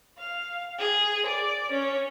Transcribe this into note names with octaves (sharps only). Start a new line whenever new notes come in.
F5
G#4
D5
C#4